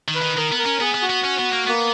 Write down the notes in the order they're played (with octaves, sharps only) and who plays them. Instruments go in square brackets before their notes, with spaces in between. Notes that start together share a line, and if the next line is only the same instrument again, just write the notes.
[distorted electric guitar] D#3
[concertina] B4
[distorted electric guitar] D#3
[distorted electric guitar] D#3 [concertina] A#4
[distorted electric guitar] B3
[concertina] A#4
[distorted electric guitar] C#4
[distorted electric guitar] B3 [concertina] G#4
[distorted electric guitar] B3
[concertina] F#4
[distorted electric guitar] B3
C#4
B3
A#3
[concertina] A#3 [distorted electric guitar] B3